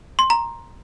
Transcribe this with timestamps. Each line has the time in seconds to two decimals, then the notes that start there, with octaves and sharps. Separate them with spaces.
0.19 C6
0.30 A#5